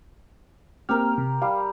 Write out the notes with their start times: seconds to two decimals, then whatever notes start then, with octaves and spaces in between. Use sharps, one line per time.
0.89 A#3 C4 G4 A#4 F6
1.18 C3
1.42 G3 F5